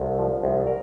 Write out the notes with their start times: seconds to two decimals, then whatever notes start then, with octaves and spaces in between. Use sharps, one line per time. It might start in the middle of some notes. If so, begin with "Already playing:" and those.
Already playing: C2 A4
0.19 F3
0.43 C2
0.67 A#4